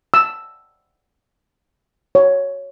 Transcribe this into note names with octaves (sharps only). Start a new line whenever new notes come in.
E6
C#5